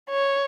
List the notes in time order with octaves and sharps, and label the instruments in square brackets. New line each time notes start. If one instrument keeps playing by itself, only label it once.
[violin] C#5